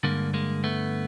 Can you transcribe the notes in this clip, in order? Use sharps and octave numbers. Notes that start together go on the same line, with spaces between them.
G2 D3 G#3 A#3
G#3 A#3
A3 B3